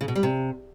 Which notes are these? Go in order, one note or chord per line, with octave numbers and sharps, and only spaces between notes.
C#3
B2
G3
C3